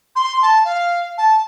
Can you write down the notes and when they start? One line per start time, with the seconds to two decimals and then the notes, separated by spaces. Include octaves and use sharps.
0.16 C6
0.42 A5
0.65 F5
1.18 A5